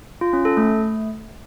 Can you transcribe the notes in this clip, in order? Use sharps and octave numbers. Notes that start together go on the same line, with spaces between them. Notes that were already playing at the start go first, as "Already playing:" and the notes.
F4
C#4
A4
A3